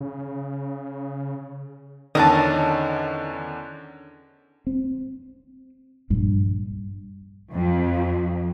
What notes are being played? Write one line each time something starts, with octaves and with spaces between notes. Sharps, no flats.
C#3
E2 D3 D#3 C#4 D4 A4 D#5 A5
C4
A#1 G2
F2